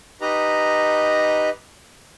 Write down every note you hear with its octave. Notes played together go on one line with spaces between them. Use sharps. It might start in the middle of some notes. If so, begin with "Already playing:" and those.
D#4 G4 B4 D#5 A#5